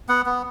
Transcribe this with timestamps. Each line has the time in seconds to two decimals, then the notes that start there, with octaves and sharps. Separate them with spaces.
0.09 B3 F#5
0.26 B3